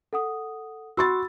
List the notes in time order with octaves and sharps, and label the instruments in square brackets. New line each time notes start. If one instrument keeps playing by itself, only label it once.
[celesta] A4 F#5 D#6
[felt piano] F#4 C6 A6 [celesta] B5 E6